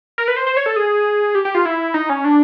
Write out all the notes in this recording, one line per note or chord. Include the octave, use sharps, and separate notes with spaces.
A#4
B4
C5
C5
C#5
A4
G#4
G4
G4
F4
E4
D#4
C#4
D4